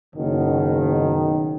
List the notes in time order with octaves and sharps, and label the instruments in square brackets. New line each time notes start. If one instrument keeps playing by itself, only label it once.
[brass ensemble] F#1 B2 D#3